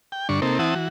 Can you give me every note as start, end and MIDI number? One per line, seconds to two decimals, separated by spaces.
0.12 0.28 79
0.29 0.40 43
0.29 0.40 50
0.29 0.40 62
0.29 0.40 85
0.42 0.59 48
0.42 0.59 58
0.42 0.59 60
0.42 0.59 63
0.42 0.59 69
0.59 0.75 52
0.59 0.75 60
0.59 0.75 64
0.59 0.75 78
0.59 0.75 81
0.59 0.75 87
0.75 0.88 52
0.75 0.88 66